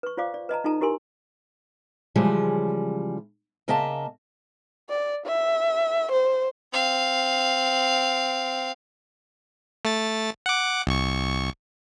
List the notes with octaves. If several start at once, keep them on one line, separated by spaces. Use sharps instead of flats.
B4 C#6
F4 C5 D5 F5 D6
D5
B4 D#5 A5 A#5
D#4 F4 A4 D#5 A5 A#5
E4 G4 A#4 G#5 C6
C#3 E3 F3 G3 G#3
C#3 A#3 D#5 E5 A5
D5
E5
C5
C4 F5
A3 A6
F#5 D6
C2 C#6